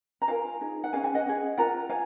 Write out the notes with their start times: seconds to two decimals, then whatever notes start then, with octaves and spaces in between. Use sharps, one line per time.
0.22 A#5
0.28 F4 A#4 F5 G#5
0.61 D#4 G#4
0.84 F#5
0.93 C#4 G#4 F5 G#5
1.04 F5 G#5
1.14 D#5 F#5
1.26 C#4 G#4
1.58 F4 A#4 F#5 A#5
1.90 F5 G#5